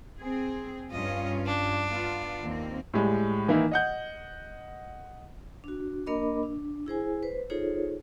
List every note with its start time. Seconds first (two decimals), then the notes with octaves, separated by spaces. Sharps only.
0.21 C4 G#4
0.91 G2 C#4 F4 D#5
1.46 D4
1.89 B3 F4
2.41 D#2 A#3 C4
2.94 A2 G3 G#3
3.48 D#3 E3 A#3 D#4 E4
3.72 D#5 F#5 G6
5.64 D4 F#4
6.06 A#3 D4 A#4 D#5 B5 D6
6.43 D4
6.86 E4 G#4 C5 G#5
7.23 B4 C5
7.50 D#4 F4 G#4 A4 C5 C#5